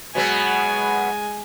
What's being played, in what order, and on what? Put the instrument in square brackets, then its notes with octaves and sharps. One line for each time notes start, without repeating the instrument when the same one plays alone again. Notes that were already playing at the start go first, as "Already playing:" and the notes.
[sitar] B2 F#3 B3 [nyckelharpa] G#3 G#5